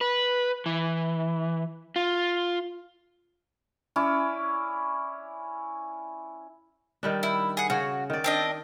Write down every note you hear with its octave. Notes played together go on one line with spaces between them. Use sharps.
B4
E3
F4
C#4 E4 D5
D#3 G3 D4
E4
G#4 F#5
C#3 F#4 C#5
D#3 D5
C4 D4 D#5